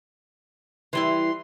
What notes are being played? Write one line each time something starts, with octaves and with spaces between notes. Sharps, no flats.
E3 G3 E4 C6